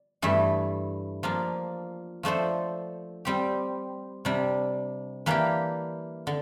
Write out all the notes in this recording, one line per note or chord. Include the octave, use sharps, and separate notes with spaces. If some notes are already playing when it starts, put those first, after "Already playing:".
Already playing: D5
G2 E3 A3
F3 A#3 D4
F3 A3 D4 A4 C5
G3 C4 G4
C3 G3 D4
E3 A#3 D4 G4
D3